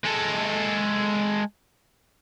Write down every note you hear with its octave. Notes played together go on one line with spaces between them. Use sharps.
G#3 A4